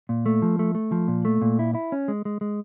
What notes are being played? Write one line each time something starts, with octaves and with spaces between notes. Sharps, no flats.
A#2
A3
F3
A3
A3
F3
A#2
A3
A#2
E4
E4
C#4
G#3
G#3
G#3